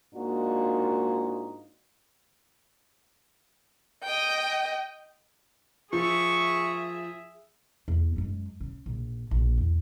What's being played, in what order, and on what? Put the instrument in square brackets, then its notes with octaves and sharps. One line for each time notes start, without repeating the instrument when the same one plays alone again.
[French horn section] G#2 A#3 D4 D#4 F4 F#4
[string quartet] D#5 G5
[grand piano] F3 [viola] G#4 E5 [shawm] C#6
[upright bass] E2
F#2 G#3
C#3
A#1
A#1
E2